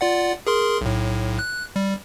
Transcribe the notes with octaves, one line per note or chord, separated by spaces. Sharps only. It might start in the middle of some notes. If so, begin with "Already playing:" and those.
F4 D5 F#5
G#4 A#4 C6
B1 A2
F#6
G3